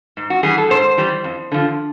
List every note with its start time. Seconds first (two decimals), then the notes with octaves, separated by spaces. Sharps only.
0.17 G#2
0.30 F#4
0.43 E3 G3 G#4
0.58 A4
0.70 G#2 C5
0.97 E3 G3
1.24 F2
1.52 D3 F3